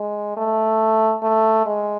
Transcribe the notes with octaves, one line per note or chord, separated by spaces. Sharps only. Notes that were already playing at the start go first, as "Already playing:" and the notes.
Already playing: G#3
A3
A3
G#3